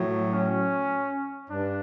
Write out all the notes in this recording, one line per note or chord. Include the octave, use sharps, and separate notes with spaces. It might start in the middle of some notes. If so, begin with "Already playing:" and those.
Already playing: A2 F#3
C#4
G2 D4